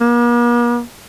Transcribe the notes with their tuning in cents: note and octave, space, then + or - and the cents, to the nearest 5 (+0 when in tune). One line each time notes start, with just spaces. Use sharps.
A#3 +45